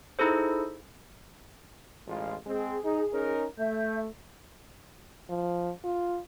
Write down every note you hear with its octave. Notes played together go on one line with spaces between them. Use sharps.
D#4 E4 G#4 A4 C5
A1 G#3 F4
G#3 C4 G#4
D#4
C#4 D#4 A#4
A3 E5 G6
F3
F4